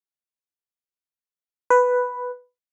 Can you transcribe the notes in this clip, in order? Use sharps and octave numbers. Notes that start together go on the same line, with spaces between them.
B4